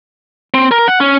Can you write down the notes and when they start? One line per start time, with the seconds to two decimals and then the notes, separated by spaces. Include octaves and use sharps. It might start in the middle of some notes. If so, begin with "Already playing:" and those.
0.54 C4
0.71 A#4
0.88 F#5
1.00 C#4